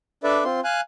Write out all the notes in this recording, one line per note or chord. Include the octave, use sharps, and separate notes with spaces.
D4 A4 B4 D5 E5
C4 F4 C6
F5 G#5 F#6